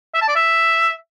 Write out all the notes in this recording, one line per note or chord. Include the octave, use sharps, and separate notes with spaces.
E5
A5
D5
E5